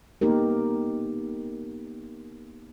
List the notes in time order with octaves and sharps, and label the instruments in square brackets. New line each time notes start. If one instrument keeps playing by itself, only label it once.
[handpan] A#3 B3 D#4 G4 A#4